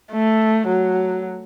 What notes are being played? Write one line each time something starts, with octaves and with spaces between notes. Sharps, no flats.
A3
F#3